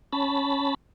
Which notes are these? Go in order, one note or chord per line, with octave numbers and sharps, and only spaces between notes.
C#4 A5 B5